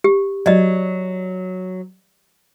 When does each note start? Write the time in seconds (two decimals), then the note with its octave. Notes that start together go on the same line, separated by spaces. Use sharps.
0.04 G4
0.46 F#3 D5 D#5